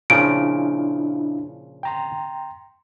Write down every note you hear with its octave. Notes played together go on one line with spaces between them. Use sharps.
A#2 C#3 F3 D4 E4 F4 D7
G5 A#5 C6